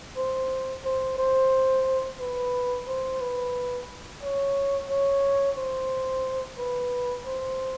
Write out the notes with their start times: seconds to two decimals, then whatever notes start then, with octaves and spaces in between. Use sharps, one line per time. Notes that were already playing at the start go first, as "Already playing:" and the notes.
0.17 C5
0.85 C5
1.18 C5
2.20 B4
2.88 C5
3.21 B4
4.23 C#5
4.90 C#5
5.58 C5
6.59 B4
7.26 C5